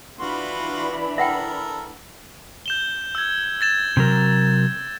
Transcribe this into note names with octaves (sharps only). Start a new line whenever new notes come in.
E3 D4 F4 F#4 B5 C6
A4 A#4 E5 F#5 G5
G6 E7 G7
E6 G#6
G#6 A6 E7
C3 F#3 A#4